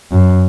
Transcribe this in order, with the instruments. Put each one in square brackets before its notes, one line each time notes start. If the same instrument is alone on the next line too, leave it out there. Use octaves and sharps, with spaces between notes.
[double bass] F#2